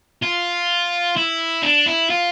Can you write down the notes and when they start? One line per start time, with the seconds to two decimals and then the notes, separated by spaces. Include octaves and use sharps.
0.23 F4
1.17 E4
1.63 D4
1.86 E4
2.10 F4